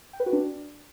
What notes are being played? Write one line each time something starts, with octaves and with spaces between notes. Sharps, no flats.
G5
B4
F#4
D4